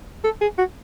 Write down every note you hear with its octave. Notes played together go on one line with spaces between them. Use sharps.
A4
G#4
F#4